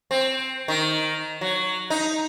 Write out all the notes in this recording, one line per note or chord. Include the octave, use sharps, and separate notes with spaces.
C4
D#3
F#3
D#4